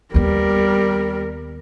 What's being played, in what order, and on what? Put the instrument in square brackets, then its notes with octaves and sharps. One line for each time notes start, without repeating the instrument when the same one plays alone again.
[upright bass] D#2 B3 [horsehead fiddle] G3 A#4